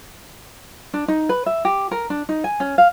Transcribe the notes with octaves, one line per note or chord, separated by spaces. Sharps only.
D4
D#4
B4
E5
G4
A#4
D4
D#4
G#5
C#4
F5